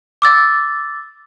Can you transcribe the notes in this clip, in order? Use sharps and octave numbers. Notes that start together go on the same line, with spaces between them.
D6 E6 A6